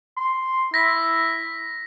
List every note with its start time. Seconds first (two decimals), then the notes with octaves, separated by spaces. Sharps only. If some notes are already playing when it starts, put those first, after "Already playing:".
0.17 C6
0.74 E4 A#6 B6